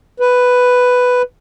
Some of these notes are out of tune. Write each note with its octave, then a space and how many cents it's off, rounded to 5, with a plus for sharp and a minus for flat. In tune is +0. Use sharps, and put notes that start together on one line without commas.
B4 +5